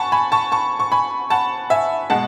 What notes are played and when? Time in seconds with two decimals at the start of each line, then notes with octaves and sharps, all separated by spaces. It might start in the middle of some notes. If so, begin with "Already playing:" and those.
Already playing: F#5 G#5 A5 B5 C#6
0.12 G#5 B5
0.32 A5 C#6
0.52 A5 C#6
0.79 C#6
0.92 G#5 B5
1.30 F#5 A5
1.70 E5 G#5
2.10 B2 G#3 F#5 A5